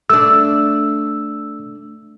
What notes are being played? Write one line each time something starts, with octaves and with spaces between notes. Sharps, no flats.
A3 D4 E6